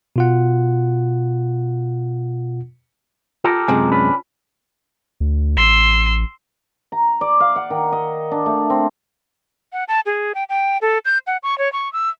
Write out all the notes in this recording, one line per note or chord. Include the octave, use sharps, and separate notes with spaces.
B2 F4 F#5
F4 G4 A4 A#4
F#2 C3 G#3 G#5
C#4 D4 B4
D2
A1 C6 E6
A#5
D5
F5
F#5
D#3
D#5
D4
A3
C4
F#5
A5
G#4
G5
G5
A4
G6
F#5
C#6
C#5
C#6
E6